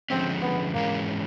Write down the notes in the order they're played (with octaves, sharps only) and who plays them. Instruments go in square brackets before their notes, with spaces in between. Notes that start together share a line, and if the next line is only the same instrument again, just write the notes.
[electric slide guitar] D3 F3 G#3 C#4 [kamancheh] C4
[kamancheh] B3
[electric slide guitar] G#2 E3 G#3 C#4 [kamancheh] A#3